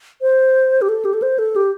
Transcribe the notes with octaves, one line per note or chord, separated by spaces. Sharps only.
C5
G4
A4
G4
A4
C5
A4
G4